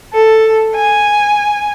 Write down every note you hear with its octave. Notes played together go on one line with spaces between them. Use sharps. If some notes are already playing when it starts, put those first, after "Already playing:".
A4
G#5